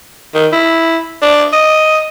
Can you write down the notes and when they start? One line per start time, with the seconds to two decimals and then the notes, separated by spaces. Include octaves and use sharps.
0.34 D#3
0.52 E4
1.22 D4
1.53 D#5